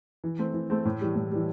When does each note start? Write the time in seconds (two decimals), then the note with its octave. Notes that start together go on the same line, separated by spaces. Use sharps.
0.24 E3
0.39 A3 C4
0.54 E3
0.70 A3 C4
0.85 A2
1.01 E3 G3
1.16 A2
1.32 E3 G3